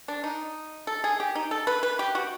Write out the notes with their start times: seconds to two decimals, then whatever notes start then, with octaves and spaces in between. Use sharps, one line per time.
0.08 D4
0.24 D#4
0.87 A4
1.04 G#4
1.20 G4
1.35 D#4
1.51 A4
1.67 B4
1.83 B4
1.99 G4
2.15 F#4